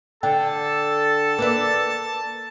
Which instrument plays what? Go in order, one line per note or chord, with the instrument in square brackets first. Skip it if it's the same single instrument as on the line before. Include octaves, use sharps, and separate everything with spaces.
[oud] D3 [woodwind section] A4 [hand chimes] G5 [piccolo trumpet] A5
[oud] A#3 B4 D5